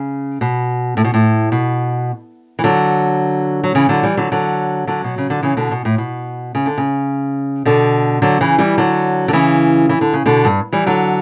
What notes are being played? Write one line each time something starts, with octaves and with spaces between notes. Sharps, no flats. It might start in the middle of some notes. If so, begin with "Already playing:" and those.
Already playing: C#3
B2
A2
B2
A2
B2
E3
D3 F#3
F#3
C#3 E3
D3 F#3
E3 G3
D3 F#3
D3 F#3
D3 F#3
B2
C#3
D3
C#3 E3
B2 D3
B2
A2
B2
C#3
D3
C#3
B2 D3
D3 F#3
C#3 E3
E3 G3
D3 F#3
D3
C#3 E3
E3
D3
C#3
B2 D3
G2
E3 G3
D3 F#3